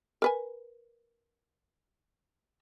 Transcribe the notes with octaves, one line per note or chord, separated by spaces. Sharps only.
A#4 B4 G#5